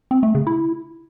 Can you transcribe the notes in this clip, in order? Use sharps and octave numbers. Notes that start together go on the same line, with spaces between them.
C4
A3
C#3
E4